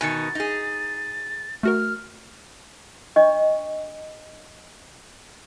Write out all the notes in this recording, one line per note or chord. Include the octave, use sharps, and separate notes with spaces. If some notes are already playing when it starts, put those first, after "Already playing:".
B2 D#3 D#4 G#5 A6 C#7
D#4 G#4
A3 F#4 A#4 F6
D4 D#5 C#6